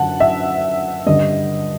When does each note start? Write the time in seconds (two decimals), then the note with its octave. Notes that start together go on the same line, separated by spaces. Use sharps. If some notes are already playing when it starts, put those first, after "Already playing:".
Already playing: F#2 D3 F#5 A5
0.20 E5
1.07 G2 D3 D#5